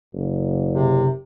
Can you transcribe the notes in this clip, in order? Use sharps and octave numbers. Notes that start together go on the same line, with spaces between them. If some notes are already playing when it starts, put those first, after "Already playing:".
F#1
C3